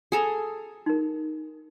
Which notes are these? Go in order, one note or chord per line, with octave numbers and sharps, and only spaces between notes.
G#4 A4 A#5
D#4 A#4